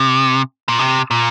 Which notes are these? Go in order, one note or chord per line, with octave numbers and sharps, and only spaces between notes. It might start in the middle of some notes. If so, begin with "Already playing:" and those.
Already playing: C3
A#2
C3
A#2